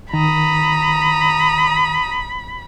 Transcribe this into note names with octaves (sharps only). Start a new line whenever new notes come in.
D#3 A#5 B5 D#6